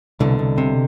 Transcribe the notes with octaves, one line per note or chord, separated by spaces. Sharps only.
C2 B2 D3
C2
C3